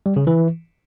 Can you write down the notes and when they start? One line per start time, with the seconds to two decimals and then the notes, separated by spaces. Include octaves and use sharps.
0.06 G3
0.16 C#3
0.27 E3